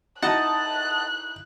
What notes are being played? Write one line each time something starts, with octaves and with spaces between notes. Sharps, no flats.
D#4 E4 D#5 F#5 A5 F#6